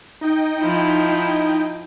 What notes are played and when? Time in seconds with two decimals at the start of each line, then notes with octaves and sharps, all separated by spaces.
0.21 D#4 D#5 G5
0.59 F3 E4